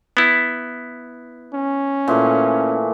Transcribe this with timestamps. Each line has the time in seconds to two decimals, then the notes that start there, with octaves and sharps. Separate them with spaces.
0.17 B3 E4
1.54 C#4
2.08 A#2 E3 A3